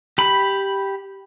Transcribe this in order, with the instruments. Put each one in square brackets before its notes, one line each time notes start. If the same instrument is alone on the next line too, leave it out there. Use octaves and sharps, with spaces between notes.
[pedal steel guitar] G4 B5